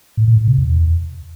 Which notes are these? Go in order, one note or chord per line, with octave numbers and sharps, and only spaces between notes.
A2
A#2
A#2
C3
E2